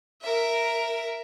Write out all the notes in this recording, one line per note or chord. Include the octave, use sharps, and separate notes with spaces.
A#4 E5